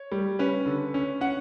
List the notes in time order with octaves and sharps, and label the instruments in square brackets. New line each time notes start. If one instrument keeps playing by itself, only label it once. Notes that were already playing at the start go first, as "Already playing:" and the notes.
Already playing: [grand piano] C#5
G3
C#4 B4
D3
C#4
C#4 F#5